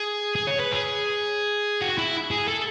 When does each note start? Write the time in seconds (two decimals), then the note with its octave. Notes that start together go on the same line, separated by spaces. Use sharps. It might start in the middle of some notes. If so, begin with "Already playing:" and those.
Already playing: G#4
0.35 G#4
0.47 C#5
0.60 B4
0.72 G#4
1.81 F#4
1.98 E4
2.31 G#4
2.48 A4